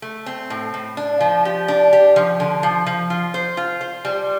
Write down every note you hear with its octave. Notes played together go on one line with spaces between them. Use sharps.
A3
C4
A2
A2
D4
F3
G4
D4
G4
F3
D3
F3
F3
F4
C5
F4
C5
G3